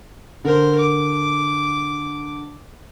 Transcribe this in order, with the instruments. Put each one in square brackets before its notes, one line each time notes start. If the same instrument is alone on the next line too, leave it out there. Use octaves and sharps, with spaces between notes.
[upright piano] D3 [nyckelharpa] A#4 C5
[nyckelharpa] D6